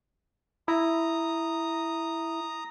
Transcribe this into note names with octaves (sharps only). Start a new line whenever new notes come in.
E4 A#5 D#6